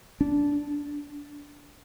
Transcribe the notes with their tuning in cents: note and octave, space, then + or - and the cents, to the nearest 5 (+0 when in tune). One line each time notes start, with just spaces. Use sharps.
D4 -15